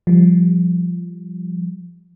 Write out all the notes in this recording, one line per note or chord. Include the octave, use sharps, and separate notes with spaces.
F3 G3